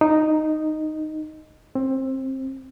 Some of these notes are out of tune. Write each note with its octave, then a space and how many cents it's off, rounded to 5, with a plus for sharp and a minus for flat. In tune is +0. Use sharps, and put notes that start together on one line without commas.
D#4 -5
C4 +20